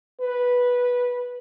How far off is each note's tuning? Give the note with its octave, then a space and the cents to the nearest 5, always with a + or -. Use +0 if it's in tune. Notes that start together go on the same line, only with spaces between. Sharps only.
B4 -10